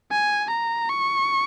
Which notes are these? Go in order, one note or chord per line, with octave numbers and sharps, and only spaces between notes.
G#5
A#5
C#6